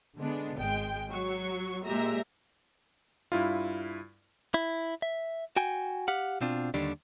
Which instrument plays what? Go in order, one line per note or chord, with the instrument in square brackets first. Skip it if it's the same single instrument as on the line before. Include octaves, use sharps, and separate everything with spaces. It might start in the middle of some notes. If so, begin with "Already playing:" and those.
[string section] D3 G#3 B3 D4
G#1 G#3 G5
F#3 C#6
A#2 G#3 G4 E5 A#5
[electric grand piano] G2 E4 F4
[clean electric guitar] E4
E5
F#4 G5 G#5
G4 F5 F#5
B2 C4 D4 F4
D#2 D3 D#3 G3 D4